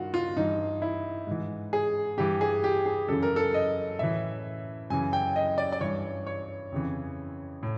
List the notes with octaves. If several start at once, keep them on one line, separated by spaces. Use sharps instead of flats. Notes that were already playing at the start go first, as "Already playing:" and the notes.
Already playing: G2 D#3 F4 F#4
F4
G2 E3 D#4
E4
G#2 E3
G#4
G2 E3 G4
G#4
G4
G#4
F#2 C#3 E3 A4
A#4
A4
D#5
A2 E3 E5
F#2 C#3 E3 G#5
G5
D#5
D5
D5
G2 E3 C#5
C#5
F2 C#3 E3
A2